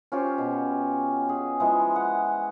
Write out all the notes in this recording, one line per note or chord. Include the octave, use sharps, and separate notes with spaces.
C#4 F4 G4 C5
B2
G#4
E3 F3 G#3
F#5